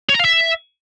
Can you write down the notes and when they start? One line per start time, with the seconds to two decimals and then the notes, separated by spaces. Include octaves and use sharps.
0.09 C#5
0.14 A#5
0.19 F5
0.24 E5